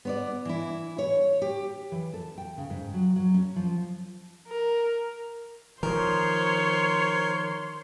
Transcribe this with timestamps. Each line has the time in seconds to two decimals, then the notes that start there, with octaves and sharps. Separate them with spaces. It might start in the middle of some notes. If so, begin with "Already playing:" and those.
0.05 B3 C#5 D5
0.45 E3 E4
0.98 C#5
1.42 G4
1.92 E3
2.14 A4
2.38 G5
2.58 C#3
2.70 G#2
2.94 F#3
3.16 F#3
3.34 C#4
3.56 F3
4.47 A#4
5.83 D#3 F3 A#4 C5 C#5 C6